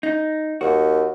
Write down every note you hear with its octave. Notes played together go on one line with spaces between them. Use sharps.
D#4
D#2 F#4